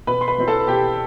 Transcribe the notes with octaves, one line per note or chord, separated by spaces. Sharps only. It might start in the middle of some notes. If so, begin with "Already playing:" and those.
B2 B4 B5
C6
B4 B5
F#3 C4 E4
A4 A5
B2 G4 G5